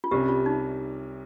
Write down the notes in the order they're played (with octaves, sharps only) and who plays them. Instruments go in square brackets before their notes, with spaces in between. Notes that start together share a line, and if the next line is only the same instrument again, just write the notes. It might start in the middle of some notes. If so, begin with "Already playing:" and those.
[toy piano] F4
[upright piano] C2 C3 G3 C#4 [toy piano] G4
[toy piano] F4
D#4